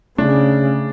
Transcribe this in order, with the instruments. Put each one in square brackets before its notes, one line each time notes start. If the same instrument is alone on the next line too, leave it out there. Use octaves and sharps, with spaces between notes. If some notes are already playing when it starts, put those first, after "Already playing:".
[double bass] C#3 [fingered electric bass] A3 C#4 [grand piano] D4